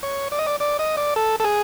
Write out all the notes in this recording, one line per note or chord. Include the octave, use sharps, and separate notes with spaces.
C#5
D5
D#5
D5
D5
D#5
D5
A4
A4
G#4